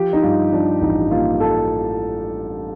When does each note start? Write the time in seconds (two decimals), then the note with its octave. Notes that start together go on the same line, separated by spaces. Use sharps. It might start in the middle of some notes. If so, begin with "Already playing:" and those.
Already playing: F3 G4
0.13 D#4
0.23 G2 F4
0.52 F3 D4
0.81 A1 D#4
1.10 A#3 F4
1.40 A4